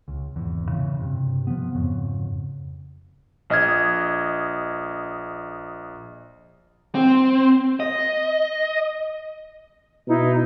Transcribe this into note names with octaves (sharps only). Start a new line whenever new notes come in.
C#2
G#1 E2
C#3 E3
G2 C3
F3 B3
F2 G#2 C#3
A#1 D#5 F6 G#6
C4
D#5
B2 D#4 E4